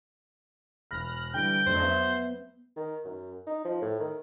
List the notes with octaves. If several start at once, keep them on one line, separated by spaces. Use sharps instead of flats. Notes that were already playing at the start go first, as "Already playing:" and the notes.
E1 B5 F6 F#6 A#6
D3 E3 G3 G5 G6
F2 F#3 A3 D4 C5
B3 E5
D#3
F#2
D#4
F3
A2
D#3